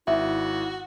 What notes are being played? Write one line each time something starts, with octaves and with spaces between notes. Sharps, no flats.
G#1 E4 F#4 E5